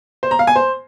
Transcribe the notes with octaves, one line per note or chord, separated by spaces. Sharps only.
C5
A#5
F5
G#5
C5